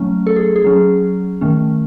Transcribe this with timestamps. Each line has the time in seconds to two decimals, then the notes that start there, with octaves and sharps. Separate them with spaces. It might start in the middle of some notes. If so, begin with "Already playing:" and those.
Already playing: F#3 A3 C#4
0.27 A4
0.36 G#4
0.56 G#4
0.64 F#3 C#4
1.41 D#3 A3 C#4